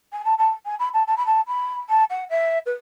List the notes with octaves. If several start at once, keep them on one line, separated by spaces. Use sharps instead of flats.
G#5
A5
A5
G#5
B5
A5
A5
B5
A5
B5
A5
F#5
E5
B4